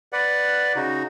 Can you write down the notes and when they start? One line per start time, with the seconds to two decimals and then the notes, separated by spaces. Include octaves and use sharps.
0.13 B4 D5 F#5
0.76 C#3 D#4 F#4